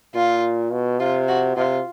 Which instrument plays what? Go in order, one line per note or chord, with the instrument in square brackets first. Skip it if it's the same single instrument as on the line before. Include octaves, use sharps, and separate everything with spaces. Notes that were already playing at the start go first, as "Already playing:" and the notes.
[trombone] A#2 [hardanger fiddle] F4
[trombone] B2
[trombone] C3 [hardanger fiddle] F4
[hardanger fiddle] F#4
[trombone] C3 [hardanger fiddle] F4